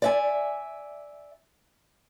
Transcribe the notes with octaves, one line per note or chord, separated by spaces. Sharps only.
D5 E5 G#5